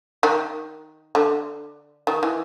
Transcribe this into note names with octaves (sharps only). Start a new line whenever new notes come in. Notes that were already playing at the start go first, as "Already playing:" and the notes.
D#3
D3
D#3
E3